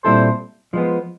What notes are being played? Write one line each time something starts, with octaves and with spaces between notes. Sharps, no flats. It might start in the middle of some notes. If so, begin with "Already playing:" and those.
A#2 G3 C4 E4 A4 C5
F3 G#3 B3